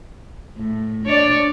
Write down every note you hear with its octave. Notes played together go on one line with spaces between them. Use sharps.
A2
D4 C#5 D5